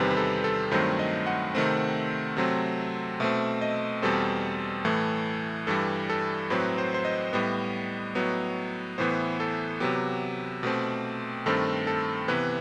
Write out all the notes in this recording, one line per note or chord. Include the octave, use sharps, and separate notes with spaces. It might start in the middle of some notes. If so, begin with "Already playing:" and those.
Already playing: E2 C3 D#3 G3 C4 B4
B4
A4
A4
G2 D#3 F#3 A3 C4 C5
D#5
F#5
C3 D#3 A3 C4
C3 F#3 A3 C4
B2 A3 C4 E5
D#5
E2 B2 G3 C4 A4
A2 E3 A3
G2 E3 G3 A4
A4
A2 F#3 C4 B4
C5
C5
D#5
A2 G3 B3
A2 F#3 B3
A2 E3 B3 C5
A4
C3 F#3 B3 G4
B2 A3 C4
G2 D#3 A3 C4 A4
A4
C3 E3 B3 B4